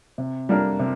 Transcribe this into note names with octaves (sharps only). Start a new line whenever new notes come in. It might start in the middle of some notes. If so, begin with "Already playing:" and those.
C3
G3 A#3 D4 A#4
C3